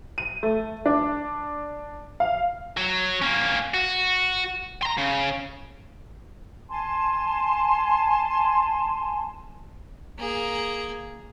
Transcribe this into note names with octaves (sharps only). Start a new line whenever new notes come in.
D#7
A3
D4
F5
F#3
A#3 C#4
F#4
A#5 C6
C#3
G#5 A5 C6
A#3 G#4